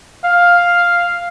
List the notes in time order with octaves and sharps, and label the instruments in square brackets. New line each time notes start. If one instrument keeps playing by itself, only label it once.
[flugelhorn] F5